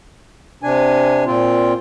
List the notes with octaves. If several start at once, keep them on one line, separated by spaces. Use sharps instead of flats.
C3 D4 G#5
A#2 C4 F4